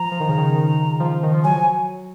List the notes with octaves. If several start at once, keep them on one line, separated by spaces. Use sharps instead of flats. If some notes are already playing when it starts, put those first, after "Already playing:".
Already playing: F3 A#5
F3
D#3
C#3
D#3
D#3
F3
D#3
F3
F#3 G#5